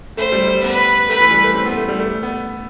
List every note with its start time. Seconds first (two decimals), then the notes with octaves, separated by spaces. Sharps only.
0.17 A3 C5
0.32 G3
0.47 G3
0.62 B3 B4
1.09 A3 B4
1.20 E3
1.31 G3
1.43 A3
1.54 C4
1.66 B3
1.77 A3
1.89 G3
1.99 A3
2.23 B3